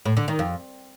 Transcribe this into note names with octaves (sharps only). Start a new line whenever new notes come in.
A2
D3
D#3
F2